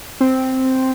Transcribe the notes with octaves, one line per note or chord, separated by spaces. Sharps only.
C4